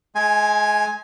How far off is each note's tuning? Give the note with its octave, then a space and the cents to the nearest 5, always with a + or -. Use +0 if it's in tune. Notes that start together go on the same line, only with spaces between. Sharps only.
G#3 +35 G#5 +0 C6 +0